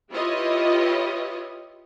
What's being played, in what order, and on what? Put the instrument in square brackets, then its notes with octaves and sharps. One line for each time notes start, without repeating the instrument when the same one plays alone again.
[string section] E4 F4 G4 B4 C#5 D#5